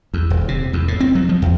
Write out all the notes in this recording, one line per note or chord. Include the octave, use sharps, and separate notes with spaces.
E2
D#1
C3
E2
A2
C4
F#3
F3
E2